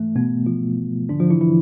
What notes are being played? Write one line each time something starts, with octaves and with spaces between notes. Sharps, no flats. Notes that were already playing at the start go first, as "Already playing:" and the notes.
Already playing: G#2 E3 A3
B2 B3
F3 F4
G#2 D3 F3 D4
F3 F4
E3 E4
E3 E4